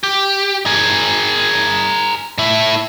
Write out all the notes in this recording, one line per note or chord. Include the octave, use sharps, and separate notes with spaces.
G4
G#4 A#4
A2 E4